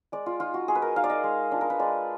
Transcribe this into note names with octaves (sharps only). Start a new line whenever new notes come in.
G#3 D5
F4
D#4 F4
F#4
G#3 G#4
B4
A#4
D#4 F5
D5
D#5
G#3
D4 F4
A#4
B4
G#3 D5